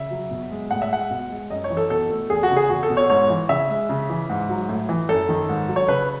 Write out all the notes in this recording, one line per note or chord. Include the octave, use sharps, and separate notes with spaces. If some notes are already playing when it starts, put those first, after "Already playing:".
Already playing: C#3 E5
F#3
B2
G#3
A2 F#5
E5
G#3 F#5
B2
G#3
F#2 D#5
C#5
E3
A4
B2 A4
A3
E2 G#4
F#4
C#3
G#4
E2 F#4
A4
B2
C#5
G#2 C#5
E3
C#3 E5
G#3
C#3
E3
G#2
F#3
A2
E3
F#2 A4
D#3
G#2
F#3
C#5
C#3 B4